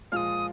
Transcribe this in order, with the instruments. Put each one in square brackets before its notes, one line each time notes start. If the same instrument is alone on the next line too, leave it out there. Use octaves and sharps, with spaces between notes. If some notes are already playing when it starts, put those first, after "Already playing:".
[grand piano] A#2 F3 G#3 F4 [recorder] D#6 F6